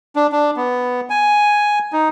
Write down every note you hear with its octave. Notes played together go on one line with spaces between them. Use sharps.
D4
D4
B3
G#5
D#4